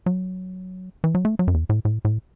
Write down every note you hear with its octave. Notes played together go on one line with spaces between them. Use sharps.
F#3
E3
F#3
A3
F#3
F#2
E2
A2
A2
A2